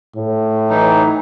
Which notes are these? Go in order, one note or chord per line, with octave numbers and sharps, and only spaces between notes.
A2
E3 F#3 D#4